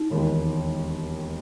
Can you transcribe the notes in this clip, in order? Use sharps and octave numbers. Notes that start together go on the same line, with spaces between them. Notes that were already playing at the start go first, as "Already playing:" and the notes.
Already playing: D#4
E1 D#2 D#3 G#3